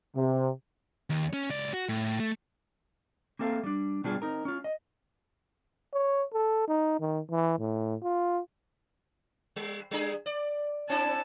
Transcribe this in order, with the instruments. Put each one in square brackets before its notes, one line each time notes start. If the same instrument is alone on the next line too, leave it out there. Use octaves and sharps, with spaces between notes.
[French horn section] C3
[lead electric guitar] D#2
C#4
C#2 D5
F#4
A2
A3
[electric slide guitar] A#3 C4 A4 E5 F5
G3 D4
B2 G3 B3 D4 F4 G#4
C4 D#4 A#4
C#4 F4
D#5
[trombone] C#5
A4
D#4
D#3
E3
A2
F4
[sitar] G3
G3 D4 G#4
D5
[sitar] C4 D4 E4 [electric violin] A5